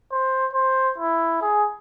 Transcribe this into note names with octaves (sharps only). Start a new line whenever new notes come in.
C5
C5
E4
G#4